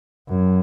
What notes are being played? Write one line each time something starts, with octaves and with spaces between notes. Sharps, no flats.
F#2